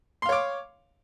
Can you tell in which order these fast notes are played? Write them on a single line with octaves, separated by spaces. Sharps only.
C6 F5 C#5 D6